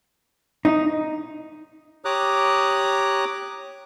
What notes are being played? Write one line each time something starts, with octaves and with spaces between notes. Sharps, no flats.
D#4
G4 C#5 A#5 D6 D#6 F#6